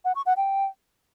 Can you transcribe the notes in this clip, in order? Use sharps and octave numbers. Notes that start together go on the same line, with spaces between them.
F#5
C#6
F#5
G5